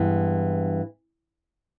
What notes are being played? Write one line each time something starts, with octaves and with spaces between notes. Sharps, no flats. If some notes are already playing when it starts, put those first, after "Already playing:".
Already playing: G2 E3 G#3 B3